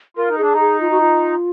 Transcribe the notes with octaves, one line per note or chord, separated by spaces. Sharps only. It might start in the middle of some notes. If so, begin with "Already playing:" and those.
F4 A#4
D#4
D4 G#4
D#4
G#4
F4
F#4
F4